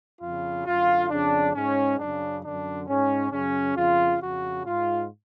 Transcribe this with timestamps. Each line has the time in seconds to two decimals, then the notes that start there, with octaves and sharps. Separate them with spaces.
0.21 F2 C#3 F4
0.66 F#2 D3 F4
1.09 F2 C#3 D4
1.54 G#2 C#4
1.98 F#2 C#3 D4
2.43 F#2 D3 D4
2.87 G#2 C#4
3.31 F#2 C#3 C#4
3.76 F2 C#3 F4
4.20 F2 C#3 F#4
4.64 G#2 F4